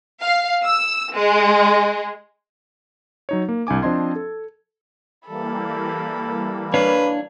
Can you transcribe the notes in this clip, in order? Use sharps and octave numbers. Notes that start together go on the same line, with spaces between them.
F5
E6
G#3
F#3 D#4 C#5
A#3
C2 D4 G#5 D6
F3 C4 D4 D#5 C6 G#6
A4
E3 G3 A#3 A4 B5
D4 B4 C#5 F5